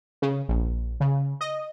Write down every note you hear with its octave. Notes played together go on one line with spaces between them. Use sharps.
C#3
A#1
C#3
D#5